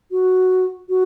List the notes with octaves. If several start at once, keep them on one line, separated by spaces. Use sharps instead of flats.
F#4
F#4